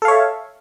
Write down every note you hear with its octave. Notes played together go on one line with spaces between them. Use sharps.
A4 C#5 E5 F5